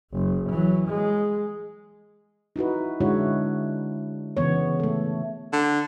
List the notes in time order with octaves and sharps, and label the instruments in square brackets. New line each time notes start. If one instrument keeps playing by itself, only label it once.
[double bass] F#1
E3 F#3
G#3
[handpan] D#4 E4 F#4 B4
D3 G#3 D4 E4 F#4 C#5
C#3 E3 B3 C#5
A3 A4
[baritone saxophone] D3